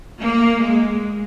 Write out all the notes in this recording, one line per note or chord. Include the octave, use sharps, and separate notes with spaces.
A#3
G#3